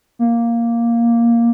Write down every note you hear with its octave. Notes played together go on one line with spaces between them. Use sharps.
A#3